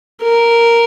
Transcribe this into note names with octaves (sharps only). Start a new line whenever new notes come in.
A#4